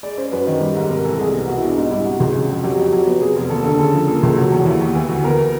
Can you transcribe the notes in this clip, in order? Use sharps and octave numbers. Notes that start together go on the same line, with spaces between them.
G#3 D5
C#4 C5
F#2 B4
D#3
G3
G#2
C3 A#4
E3 A4
C2 G#4
B3
B2 F#4
E4
G#3
D4
G#2 D#4
G3 E4
C3 F#4
C#2
C#3
F2
F#3 G4
F2
F#3
B3
C3 G#4
F1
D#2 A4
D3 A4
C#3 A4
F3
A#3 A4
C#2
F#3
E2
D#2 E4
D#2
E3
D2
B3 A#4